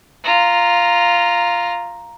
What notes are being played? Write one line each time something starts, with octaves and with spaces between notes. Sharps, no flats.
F4 A#5